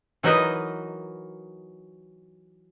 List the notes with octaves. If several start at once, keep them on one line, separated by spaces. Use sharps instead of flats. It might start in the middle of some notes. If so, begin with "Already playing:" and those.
E3 F#3 D#4 A#4 B4 D#5